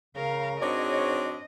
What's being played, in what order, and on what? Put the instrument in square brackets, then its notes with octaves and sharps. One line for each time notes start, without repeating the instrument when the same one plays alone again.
[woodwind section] C#3 [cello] A#4 F5
[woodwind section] G#2 F#4 [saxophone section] C4 D4 C#5 [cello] D#5